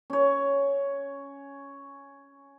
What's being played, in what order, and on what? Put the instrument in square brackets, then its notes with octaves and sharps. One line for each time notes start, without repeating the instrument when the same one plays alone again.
[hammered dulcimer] C#4 C#5